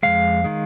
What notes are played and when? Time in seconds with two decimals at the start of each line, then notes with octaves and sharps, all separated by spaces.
0.03 F2 D#3 G#3 F5
0.44 D#3 G#3